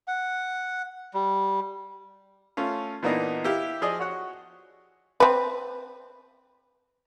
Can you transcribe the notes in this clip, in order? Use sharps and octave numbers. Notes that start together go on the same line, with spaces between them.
F#5
G3
A3 C#4 F4
A#2 E3 A#3 B3 D4 D#4
E4 G4 F5
F3 G#4 D5 D#5
F#4 C#5 F#5
C4 B4